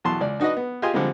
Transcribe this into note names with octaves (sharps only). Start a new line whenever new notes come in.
E2 B2 F#3 A5 C6
C#2 D5
D4 D#4 F#4 B4 D#5
B3
F4 G4 G#4 D#5 G#5 C6
D3 F3 G3 G#3 C4